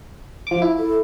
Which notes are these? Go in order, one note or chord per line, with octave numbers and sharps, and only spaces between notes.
F3 D6
E4
A4